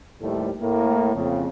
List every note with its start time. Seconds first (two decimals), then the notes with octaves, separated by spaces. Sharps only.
0.20 D#2 A2 F3 G3 A3
0.61 A2 A#3
1.15 F2 C#3